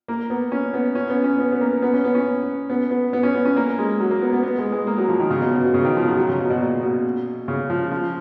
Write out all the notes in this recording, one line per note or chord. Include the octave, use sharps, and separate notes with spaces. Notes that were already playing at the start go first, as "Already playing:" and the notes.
A#3
B3
C#4
B3
C#4
B3
C#4
B3
B3
A#3
B3
C#4
B3
C#4
B3
B3
B3
C#4
B3
C#4
A#3
G#3
F#3
A#3
B3
B3
B3
G#3
G#3
A#3
F#3
F3
D#3
C#3
B2
B2
B2
C#3
D#3
F3
F#3
F#3
C#3
B2
B2
A#2
B2
C#3
F3
F3